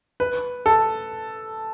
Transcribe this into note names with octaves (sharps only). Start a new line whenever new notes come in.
B4
A4